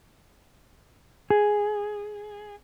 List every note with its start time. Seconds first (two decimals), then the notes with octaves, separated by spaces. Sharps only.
1.30 G#4